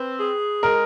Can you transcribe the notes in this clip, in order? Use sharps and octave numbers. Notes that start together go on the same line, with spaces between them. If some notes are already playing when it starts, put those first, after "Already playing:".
Already playing: C4 B4
G#4
G#3 A#4